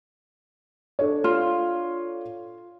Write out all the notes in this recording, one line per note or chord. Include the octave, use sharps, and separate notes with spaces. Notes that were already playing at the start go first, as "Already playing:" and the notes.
D4 A4 C#5
F4